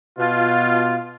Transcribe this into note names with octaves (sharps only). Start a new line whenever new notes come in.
B2 F4